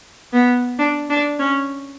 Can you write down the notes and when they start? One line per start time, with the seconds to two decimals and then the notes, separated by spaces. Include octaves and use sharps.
0.33 B3
0.79 D4
1.10 D4
1.39 C#4